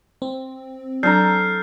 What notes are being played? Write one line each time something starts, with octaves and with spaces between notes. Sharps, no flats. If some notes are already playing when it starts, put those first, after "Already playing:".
C4
F#3 D4 A4 A#5 F6 G6 C7